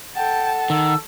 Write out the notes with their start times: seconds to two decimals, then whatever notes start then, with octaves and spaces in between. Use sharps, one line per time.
0.15 A4 F#5 G5 A5
0.70 D#3 E6